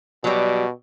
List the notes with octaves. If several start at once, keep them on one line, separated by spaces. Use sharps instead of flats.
B2 F#3 G3